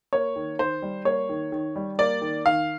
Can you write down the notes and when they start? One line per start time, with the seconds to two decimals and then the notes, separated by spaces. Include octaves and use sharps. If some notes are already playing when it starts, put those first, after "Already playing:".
0.13 A#3 C#5
0.36 D#3
0.59 D#3 C5
0.82 G3
1.05 A#3 C#5
1.29 D#3
1.52 D#3
1.76 G3
1.99 A#3 D5
2.22 D#3
2.45 D#3 F5